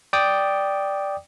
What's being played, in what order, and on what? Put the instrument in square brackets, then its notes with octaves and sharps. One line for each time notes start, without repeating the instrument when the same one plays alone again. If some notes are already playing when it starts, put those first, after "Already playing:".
[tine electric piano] D5 G5 D6 D#6